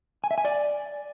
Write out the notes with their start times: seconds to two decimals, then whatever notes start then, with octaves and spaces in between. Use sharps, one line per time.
0.24 G#5
0.31 E5
0.38 G#5
0.45 D5